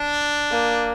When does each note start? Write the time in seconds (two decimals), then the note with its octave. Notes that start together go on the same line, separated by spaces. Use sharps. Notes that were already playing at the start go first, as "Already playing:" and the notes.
Already playing: D4
0.51 A#3